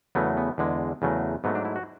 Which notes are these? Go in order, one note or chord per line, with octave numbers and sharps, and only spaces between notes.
E2 C#3 F#3 A3 B3
B3
E2 D3 G#3
E2 C#3 F#3 A3
G#2 F#3 A3 B3
D4
E4
F#4